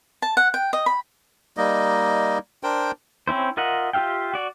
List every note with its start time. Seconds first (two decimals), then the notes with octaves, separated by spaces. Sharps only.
0.22 A5
0.37 F#5
0.54 G5
0.73 D#5
0.86 B5
1.57 G3 A#3 D#4 D#5
2.63 D4 A#4 C5 G5
3.28 C4 C#4 E4 C5
3.57 F4 A#4 D#5 E5 F#5
3.93 F4 G4 E5 F5 G5
4.34 F#4 D5